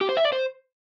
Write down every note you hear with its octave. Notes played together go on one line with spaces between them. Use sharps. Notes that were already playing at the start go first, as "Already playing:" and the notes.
G4
C5
E5
D5
C5